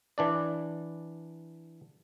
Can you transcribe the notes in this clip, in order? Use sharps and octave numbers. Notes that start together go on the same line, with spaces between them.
E3 D4 D5